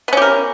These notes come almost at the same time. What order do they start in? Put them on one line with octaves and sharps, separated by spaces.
B3 C#4 G4 A#4